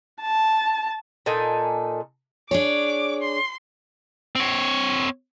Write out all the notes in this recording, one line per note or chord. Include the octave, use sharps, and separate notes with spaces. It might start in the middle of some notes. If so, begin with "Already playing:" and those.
A5
A#2 D#4 A4 G#5
D4 G#4 C#5 D6
C6
C4 C#5